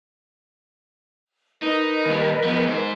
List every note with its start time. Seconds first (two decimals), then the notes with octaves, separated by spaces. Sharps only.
1.62 D#4 A#4 B4 D#5
2.06 D#2 G3
2.43 F3 B3
2.68 G#2 C5